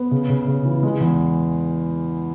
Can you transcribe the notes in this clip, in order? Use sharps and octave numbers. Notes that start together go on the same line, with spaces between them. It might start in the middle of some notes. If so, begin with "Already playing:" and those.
Already playing: B3
C#3
C#3
C#3
E3
G#3
E2